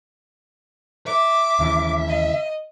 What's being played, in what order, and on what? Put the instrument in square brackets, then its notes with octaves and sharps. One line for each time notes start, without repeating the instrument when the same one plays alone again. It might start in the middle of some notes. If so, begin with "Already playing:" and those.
[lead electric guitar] E5 [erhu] D6
[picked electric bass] D#2 C#3 E3
[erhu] D#5